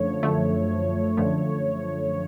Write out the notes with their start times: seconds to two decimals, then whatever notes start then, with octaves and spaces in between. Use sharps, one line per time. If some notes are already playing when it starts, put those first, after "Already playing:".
Already playing: F#2 D3 F3 A3 C#5
0.23 F#2 D3 F3 A3
1.17 F#2 D3 F3 A3